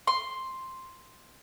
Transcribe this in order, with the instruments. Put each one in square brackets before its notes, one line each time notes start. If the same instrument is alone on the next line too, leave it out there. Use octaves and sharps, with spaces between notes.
[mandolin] C6